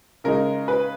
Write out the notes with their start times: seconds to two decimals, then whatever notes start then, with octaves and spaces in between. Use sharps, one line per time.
0.24 C#3 G#3 D#4 A#4
0.68 B4